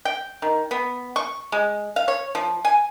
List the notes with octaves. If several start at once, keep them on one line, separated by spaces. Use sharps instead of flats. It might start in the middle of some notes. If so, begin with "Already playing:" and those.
G5
D#3
B3
C#6
G#3
F5
C#5
F3
G#5